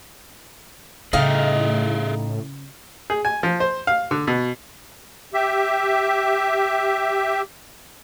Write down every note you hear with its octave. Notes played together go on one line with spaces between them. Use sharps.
A2 C#3 D#4 G#4 A4 E5 F5 G5
G#4
G#5
F3
C5
F5
D3
B2
G4 E5